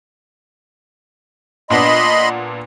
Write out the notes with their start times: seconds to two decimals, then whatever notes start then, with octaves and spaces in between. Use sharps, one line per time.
1.70 A#2 B3 D4 D#5 B5 C6